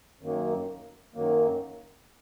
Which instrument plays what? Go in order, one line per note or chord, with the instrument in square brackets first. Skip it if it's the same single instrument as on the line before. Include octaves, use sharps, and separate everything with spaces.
[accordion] F#2 D#3 F#3 A#3
F#2 D#3 F#3 A#3